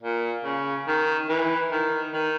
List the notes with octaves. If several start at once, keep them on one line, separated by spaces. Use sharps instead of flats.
A#2
C#3
D#3
E3
D#3
D#3